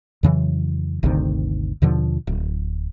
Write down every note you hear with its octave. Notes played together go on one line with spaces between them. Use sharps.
F2 C#3 E3 F#3
G1 D2 C3 D#3
D#2 B2 D3 F3
D1